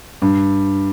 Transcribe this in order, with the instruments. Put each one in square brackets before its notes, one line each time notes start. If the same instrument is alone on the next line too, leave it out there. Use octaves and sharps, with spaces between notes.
[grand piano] G2